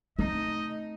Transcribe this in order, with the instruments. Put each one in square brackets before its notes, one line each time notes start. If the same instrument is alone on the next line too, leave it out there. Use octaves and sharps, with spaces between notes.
[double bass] A3 D#4 [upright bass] C4 [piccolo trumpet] D#5